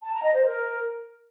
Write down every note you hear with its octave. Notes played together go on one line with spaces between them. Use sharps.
A5
A#5
D#5
C5
A#4